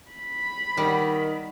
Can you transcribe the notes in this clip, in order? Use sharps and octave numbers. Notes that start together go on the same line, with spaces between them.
B5
D#3 G3 B3